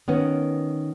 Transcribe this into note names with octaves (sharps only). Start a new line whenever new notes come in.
D#3 B3 C#4